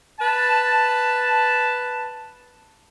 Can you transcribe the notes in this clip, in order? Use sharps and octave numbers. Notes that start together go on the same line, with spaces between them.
B4 A5